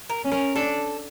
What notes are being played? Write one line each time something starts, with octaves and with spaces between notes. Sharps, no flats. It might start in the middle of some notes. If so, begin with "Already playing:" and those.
A#4
C#4
A#4
D4 A4